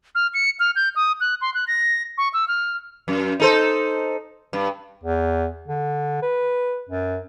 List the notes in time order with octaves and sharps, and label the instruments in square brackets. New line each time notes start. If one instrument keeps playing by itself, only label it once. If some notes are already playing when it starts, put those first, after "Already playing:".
[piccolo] F6
C#7
F6
G6
D#6
F#6
C6
F#6
A#6
C#6
E6
F6
[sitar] F#2
D#4 A4 C5
G2
[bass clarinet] E2
D3
B4
F#2